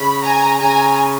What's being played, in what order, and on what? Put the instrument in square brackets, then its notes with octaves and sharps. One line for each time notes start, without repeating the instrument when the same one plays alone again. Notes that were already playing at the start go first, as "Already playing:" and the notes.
Already playing: [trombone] C#3 [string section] B5
[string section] G#5 A#5
[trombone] C#3 [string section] G#5 A#5